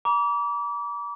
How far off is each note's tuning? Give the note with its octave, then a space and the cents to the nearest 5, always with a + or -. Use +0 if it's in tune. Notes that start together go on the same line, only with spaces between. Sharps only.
A#5 +40 D6 -30